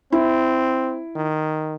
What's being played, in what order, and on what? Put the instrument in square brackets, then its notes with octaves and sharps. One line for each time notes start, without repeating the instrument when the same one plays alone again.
[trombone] C4 [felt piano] E4
[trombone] D#3